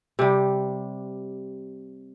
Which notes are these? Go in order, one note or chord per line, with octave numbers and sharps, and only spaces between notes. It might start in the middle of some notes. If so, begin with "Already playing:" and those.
C3 G3